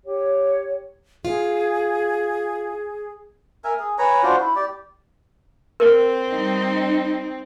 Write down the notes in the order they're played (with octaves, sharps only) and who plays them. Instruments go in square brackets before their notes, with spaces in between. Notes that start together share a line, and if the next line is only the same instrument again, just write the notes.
[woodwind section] G4 C#5
[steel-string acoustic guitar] F4 [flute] G#4
[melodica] A#4 E5 G#5
G#4
B4 C#5 G#5 A#5
D4 F4 F#4 C5
E4
G4 D5
[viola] C4 [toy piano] A#4
[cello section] G3 D#4